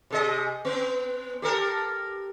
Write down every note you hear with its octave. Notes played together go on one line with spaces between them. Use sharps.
C3 G#4 D#5
B3 C4
G4 A4 A#4